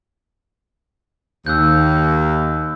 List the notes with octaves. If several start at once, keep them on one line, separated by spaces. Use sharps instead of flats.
D#2 E6 F#6 G6